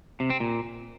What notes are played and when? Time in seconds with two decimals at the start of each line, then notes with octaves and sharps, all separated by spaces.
0.20 C3
0.30 C4
0.40 A#2